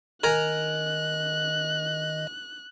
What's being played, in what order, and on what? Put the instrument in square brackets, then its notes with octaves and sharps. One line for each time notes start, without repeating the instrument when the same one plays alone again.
[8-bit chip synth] D#3 D#5 [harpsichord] A#4 G#5 A#5 [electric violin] F#6